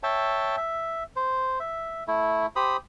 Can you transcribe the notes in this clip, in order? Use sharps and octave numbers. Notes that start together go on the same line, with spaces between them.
C#5 E5 G5 A5
E5
C5
E5
A3 E4
G4 C5 B5 D#6